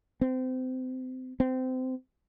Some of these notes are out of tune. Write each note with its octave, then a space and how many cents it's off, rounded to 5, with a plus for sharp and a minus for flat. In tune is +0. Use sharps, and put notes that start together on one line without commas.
C4 -30
C4 -25